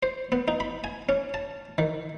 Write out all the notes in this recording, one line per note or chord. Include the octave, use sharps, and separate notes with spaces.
C5
B3
D#4
B5
G#5
C#4
A5
D#3